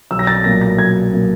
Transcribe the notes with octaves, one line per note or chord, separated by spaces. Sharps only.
B1 E6
A#6
A6
A#2 F#3 A#3 A#6
A#6
B1 G#6
A#2 F#3 A#3